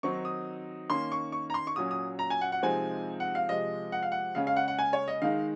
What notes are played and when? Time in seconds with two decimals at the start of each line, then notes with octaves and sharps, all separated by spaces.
0.03 D#3 F#3 C4 D#4 C#6
0.25 D#6
0.90 D#3 A#3 C#4 C6
1.12 C#6
1.32 C#6
1.50 A#5
1.54 C6
1.67 C#6
1.76 A#2 F#3 C#4 D#6
1.91 D#6
2.19 A#5
2.30 G#5
2.41 F#5
2.52 F#5
2.62 C3 F3 G#3 C4 D#4 G#5
3.20 F#5
3.35 F5
3.49 C3 F3 G#3 D#5
3.92 F#5
4.03 F5
4.12 F#5
4.35 C#3 G#3 C#4 F5
4.47 F5
4.57 F#5
4.68 F#5
4.79 G#5
4.93 C#5
5.08 D#5
5.22 D#3 G#3 D#4 F5